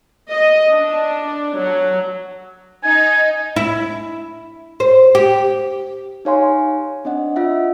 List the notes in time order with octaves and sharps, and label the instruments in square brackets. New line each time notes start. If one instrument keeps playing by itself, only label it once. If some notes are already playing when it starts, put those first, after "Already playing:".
[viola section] D#5
D4
F#3
[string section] D#4 [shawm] G#5
[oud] E4
C5
G4
[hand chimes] D#4 G4 C#5 F5 G#5 C6
C4 D4 D#5 F#5
F4 D#5 E5 F#5